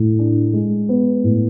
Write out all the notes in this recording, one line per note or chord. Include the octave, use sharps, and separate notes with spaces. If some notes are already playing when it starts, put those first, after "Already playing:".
Already playing: A2
D4
G#3
B3
A2